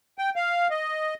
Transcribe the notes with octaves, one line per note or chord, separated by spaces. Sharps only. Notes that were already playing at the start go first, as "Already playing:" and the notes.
G5
F5
D#5